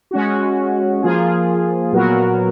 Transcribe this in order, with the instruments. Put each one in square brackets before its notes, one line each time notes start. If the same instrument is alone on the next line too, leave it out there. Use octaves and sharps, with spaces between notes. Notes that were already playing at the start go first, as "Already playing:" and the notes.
[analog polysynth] G#3 C#4 F#4
F3 A#3 F4 G#4
A#2 F#3 B3 F#4 A#4